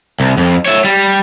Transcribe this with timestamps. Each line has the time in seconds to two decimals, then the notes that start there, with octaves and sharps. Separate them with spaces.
0.20 C2
0.37 F2
0.65 C#5 E5
0.84 G3